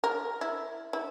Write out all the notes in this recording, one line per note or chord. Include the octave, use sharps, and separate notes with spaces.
A#4
E4
E4